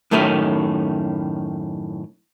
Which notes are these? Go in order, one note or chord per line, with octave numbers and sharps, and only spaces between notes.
F#2 A2 D#3 A3 C#4